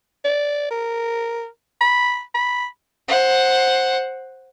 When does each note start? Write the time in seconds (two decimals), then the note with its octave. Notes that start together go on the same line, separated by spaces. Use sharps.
0.25 D5
0.71 A#4
1.81 B5
2.34 B5
3.08 C5 F#5